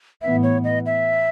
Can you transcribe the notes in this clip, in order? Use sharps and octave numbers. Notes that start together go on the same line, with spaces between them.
A2 E3 B3 E5
C#5
D#5
E5